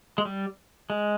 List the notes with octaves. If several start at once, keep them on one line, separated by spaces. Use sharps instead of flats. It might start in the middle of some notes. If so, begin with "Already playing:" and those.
G#3
G3
G#3